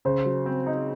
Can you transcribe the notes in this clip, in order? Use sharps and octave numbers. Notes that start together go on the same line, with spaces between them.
C#3 C5
F#3
C4
D#4